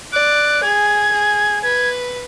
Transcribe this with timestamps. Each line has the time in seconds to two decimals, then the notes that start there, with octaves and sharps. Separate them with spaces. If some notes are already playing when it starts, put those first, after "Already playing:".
0.13 D5 F#6
0.62 G#4 G#6
1.12 G#4
1.63 B4 G#6